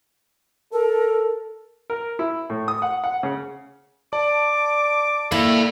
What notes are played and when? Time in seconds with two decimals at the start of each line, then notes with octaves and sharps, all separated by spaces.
0.73 A4 A#4
1.90 A#4
2.19 E4
2.50 A2
2.68 D#6
2.82 F#5
3.04 F#5
3.23 C#3
4.13 D5 A5 D6
5.32 A#3 E4 A4 B5